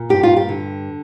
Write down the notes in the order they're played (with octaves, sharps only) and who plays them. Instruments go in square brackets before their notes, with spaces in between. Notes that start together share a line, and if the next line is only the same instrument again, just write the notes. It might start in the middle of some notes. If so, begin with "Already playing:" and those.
Already playing: [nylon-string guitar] A#2
G2 G4
F4
G4
D3